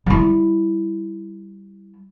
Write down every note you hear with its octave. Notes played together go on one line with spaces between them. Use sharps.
G3 E4